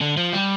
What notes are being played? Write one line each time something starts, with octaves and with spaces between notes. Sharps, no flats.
D3
F3
G3